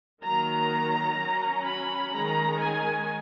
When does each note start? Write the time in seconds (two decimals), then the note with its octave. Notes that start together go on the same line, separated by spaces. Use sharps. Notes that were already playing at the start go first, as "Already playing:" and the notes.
0.23 D#3 F#3 A#3 A#5
1.19 F#3 C#4
1.66 B5
2.14 D#3 G#3 C#4 A#5
2.62 G#5